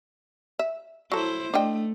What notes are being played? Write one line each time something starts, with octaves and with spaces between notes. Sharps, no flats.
E5
F#3 E4 A4 C5
A3 D4 D#5 G5